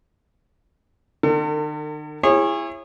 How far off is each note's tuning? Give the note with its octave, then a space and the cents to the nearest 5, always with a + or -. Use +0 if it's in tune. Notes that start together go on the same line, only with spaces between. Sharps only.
D#3 -45 A4 +45
E4 +20 G#4 -25 C#5 -25